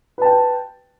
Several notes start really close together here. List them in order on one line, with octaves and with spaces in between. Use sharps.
B4 A5 G5